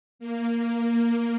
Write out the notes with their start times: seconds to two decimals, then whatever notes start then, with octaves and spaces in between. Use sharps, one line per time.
0.19 A#3